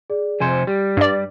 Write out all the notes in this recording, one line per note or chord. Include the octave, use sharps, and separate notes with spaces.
G#4 D5
F2 C3 C5 G#5 G#6 C#7
G3 G4
G2 D5